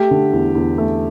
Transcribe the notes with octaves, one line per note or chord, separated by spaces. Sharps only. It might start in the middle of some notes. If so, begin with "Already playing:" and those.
Already playing: A3 G4
D3
E2
E2
A3